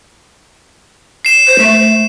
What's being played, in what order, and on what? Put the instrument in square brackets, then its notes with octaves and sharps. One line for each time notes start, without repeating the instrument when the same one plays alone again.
[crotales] C7 E7
[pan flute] C5
A3